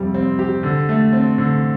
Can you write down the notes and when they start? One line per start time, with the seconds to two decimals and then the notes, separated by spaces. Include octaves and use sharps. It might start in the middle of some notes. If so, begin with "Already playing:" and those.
Already playing: F2 C3 G3
0.14 C4
0.39 G4
0.63 D3
0.89 A3
1.13 C4
1.38 D3